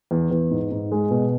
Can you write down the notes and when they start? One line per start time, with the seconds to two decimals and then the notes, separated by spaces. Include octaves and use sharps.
0.11 E2
0.31 E2
0.51 G#2
0.71 G#2
0.92 G#3
1.11 B2